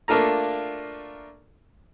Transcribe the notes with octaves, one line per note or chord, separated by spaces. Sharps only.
A3 A#3 D4 F4 A4 A#5